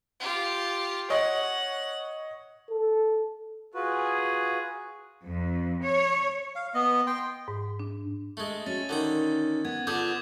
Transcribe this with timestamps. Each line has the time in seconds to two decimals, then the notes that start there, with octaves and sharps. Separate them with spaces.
0.20 F4 G4
1.10 C#5 D#5 F#5
2.70 A4
3.74 F4 F#4 G#4 B4
5.27 F2
5.84 C#5
6.55 F5
6.74 B3 D#5
7.07 G5 C6
7.48 G#2
7.80 D4
8.37 G#3 A3
8.66 C#4 F#4 A6
8.89 D3 D#3 D#4 A#5
9.65 B3 G#6
9.87 D3 F4 G#4 D6 D#6 G6